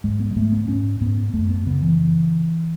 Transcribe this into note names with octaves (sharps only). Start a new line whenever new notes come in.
G#2 G#3
B3
G#3
G#2 A3
B3
G#2 C#4
G#2 B3
F#2 A3
B3
C#3 B3
E3